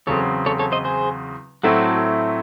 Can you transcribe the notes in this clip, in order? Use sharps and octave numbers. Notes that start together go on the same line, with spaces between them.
E2 C#3 F#3 C4 A4 C#5
A4 C#5
A4 C#5
C5 D#5
G#4 C5
A2 F#3 A3 C4 E4 F#4 A4